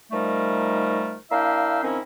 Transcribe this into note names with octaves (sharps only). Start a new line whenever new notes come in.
D#3 F3 G3 A3 D#4 A#4
A#3 D4 E4 E5 F5 G5
D#3 F3 C4 C#4 D#4 E4